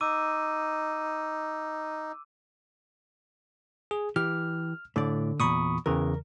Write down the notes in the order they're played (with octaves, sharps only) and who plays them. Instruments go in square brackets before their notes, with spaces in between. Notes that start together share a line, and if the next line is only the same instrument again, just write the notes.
[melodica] D#4 [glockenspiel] D6 E6 D#7
[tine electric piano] G#4
[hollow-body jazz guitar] E3 G4 [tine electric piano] F6
[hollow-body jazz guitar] A2 D5 [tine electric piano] D3
[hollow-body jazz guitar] E2 G2 A#2 [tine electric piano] B5 C#6 D#6
[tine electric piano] E2 C#3 E3 [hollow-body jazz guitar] A#4